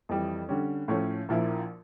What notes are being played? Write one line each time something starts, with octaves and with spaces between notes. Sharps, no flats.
F2 E3 G3
D3 G3 C#4
A2 F3 A3 C#4
A#1 A#2 F3 A#3 E4